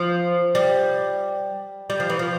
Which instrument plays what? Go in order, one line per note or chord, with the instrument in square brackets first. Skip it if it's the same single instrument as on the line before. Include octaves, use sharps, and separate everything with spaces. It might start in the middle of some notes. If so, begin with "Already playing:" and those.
Already playing: [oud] F3
G3
G3
F3
E3
F3